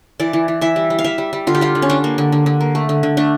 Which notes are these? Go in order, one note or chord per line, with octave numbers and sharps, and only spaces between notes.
E3 D5
E3
E3
E3 E5
G3
G3
F5
G3 E5
G3
G3
D3 F4
G4
G3 F4
D3
C#4
G3 D4
A#3
D3
D3
D3
A#3
A3
D3
D3
A3 D4